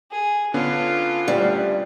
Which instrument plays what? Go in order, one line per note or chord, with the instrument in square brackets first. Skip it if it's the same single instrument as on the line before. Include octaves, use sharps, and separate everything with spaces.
[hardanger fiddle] G#4
[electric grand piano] D3 B3 C#4 [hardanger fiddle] F4
[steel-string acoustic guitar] D2 G3